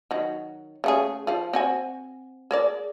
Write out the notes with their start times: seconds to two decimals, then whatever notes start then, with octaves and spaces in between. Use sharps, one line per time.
0.11 D#3 F#3
0.84 C#3 A3 G#4
1.27 F3 F4
1.53 C4 F#4 G#5
2.51 G#4 A#4 D5